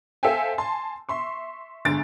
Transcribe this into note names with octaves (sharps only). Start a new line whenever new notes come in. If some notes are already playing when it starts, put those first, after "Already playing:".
A4 C5 E5 F5 G5 G#5
G#5 A5 C6
E5 C6 C#6
G1 G#2 D3 G#5 A6 D7